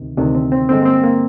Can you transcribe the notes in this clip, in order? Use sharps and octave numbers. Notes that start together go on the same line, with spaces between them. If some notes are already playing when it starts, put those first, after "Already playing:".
Already playing: D2 C3 D#3
D2 C3 D#3 D4
C4
C4
G2 D3 G#3 C4
A#3
C4
A#3